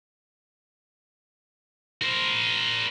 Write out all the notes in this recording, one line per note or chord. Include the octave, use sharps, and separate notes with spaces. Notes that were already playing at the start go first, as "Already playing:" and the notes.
A#4 C5